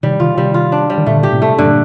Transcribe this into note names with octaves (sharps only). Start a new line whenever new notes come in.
C3 D#3 G3
C3 D#3 F4
C3 D#3 G3
F4
D4
G3
D#3
A#2 D3 A3
G4
A2 C3
A3
G2 A#2 D3